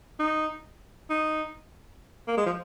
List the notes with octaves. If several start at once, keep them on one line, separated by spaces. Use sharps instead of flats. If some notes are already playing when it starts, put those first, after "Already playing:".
D#4
D#4
A#3
G#3
F3